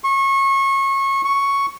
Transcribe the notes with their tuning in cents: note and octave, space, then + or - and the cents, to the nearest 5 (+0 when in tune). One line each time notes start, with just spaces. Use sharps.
C#6 -25
C#6 +0